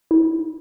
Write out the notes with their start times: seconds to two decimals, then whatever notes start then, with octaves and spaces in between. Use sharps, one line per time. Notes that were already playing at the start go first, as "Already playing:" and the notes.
0.11 E4
0.24 D#4
0.38 E4